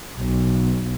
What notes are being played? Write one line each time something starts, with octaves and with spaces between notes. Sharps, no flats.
B1